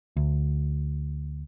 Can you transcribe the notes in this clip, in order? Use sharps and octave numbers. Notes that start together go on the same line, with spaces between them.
D2